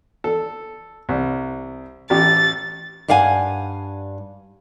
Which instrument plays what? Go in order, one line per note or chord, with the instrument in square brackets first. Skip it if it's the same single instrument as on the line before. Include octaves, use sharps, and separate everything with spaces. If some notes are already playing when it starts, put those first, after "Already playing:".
[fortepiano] A4
C2
[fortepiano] A1 G4 [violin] A6
[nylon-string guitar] G2 D5 F5 F#5 G#5